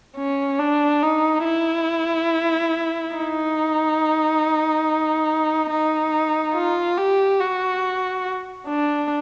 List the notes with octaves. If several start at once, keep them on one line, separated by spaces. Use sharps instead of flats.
C#4
D4
D#4
E4
D#4
D#4
F4
G4
F#4
D4